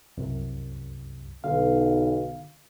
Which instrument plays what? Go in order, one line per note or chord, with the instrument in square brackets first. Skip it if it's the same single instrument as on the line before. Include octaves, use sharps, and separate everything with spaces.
[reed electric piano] C2 F#2 C3
[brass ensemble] B1 [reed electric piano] D3 F5